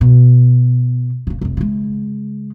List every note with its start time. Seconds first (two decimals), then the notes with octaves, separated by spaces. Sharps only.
0.01 B2
1.27 D#1 C#3
1.41 F1 C3
1.57 C#3 G#3